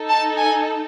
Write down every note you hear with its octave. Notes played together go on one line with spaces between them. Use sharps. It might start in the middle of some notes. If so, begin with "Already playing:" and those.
Already playing: D#4 A4
A5
G#5